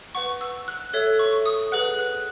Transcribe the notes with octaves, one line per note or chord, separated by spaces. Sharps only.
B4 F#5 C#6
E6
F#6
A4 C#5 E5
C#6
D#6
G#4 B4 F#5 F#6
F#6